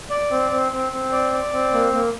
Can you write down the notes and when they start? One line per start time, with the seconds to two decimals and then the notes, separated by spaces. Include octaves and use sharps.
0.10 D5
0.31 C4
0.51 C4
0.72 C4
0.92 C4
1.12 D5
1.32 D5
1.53 C4
1.73 A#3
1.93 A#3